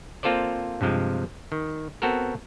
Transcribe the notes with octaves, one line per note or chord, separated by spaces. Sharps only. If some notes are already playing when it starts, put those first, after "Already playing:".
A#3 C4 F4 A4 C5 D5
G2 C3 F3 G#3
D#3
B3 C4 F#4 A4 A#4